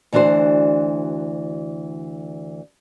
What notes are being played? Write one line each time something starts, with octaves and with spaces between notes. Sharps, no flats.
D2 E3 D4 F#4 C5